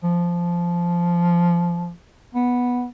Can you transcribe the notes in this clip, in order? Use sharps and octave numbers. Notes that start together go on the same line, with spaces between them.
F3
B3